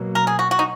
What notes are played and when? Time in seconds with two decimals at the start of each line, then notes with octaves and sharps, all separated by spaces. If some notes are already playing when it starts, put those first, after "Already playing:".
Already playing: B2 F#3 A#3
0.15 A#4
0.27 G#4
0.39 F#4
0.51 F#4
0.59 D#4